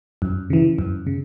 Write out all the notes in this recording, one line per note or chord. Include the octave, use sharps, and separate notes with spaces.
F#2
C#3 E3
F#2
C#3